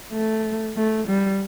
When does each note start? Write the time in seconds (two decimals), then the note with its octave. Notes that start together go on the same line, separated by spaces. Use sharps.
0.12 A3
0.77 A3
1.08 G3